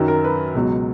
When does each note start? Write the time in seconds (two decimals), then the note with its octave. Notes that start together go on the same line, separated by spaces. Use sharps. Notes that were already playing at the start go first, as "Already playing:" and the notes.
Already playing: F#2 D#3 F#3
0.08 A#4
0.24 B4
0.55 C#2 B2 F#3